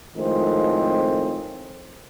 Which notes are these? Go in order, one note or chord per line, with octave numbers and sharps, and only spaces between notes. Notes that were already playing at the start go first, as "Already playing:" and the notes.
F2 A2 D#3 F3 G#3 C4